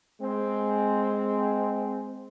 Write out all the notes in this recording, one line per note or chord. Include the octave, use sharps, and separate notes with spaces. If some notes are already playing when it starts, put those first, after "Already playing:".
G#3 C4